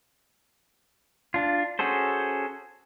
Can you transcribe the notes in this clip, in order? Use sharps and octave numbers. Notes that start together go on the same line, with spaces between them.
D4 F4
C#4 F#4 G#4 A4 C5